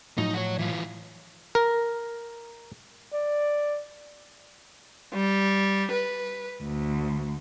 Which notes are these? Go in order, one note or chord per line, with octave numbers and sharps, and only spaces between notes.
A2 F3 F#3 D#4
F#4 C#5
E3 F4
A#4
D5
G3
B4
D2